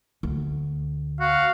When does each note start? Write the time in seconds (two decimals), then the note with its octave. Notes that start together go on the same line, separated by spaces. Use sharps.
0.23 D2
1.20 F#4 F5